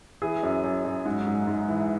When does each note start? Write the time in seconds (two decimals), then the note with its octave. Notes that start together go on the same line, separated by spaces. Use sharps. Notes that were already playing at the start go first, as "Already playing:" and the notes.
0.22 E3 G#4
0.43 F#2
0.64 F#2
0.85 F#2
1.05 G#2
1.27 G#2
1.47 G#2
1.68 E3